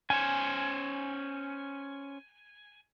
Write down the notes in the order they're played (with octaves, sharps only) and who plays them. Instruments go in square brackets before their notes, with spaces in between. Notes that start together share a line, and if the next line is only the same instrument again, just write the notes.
[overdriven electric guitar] C#4 C5 [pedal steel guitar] G#5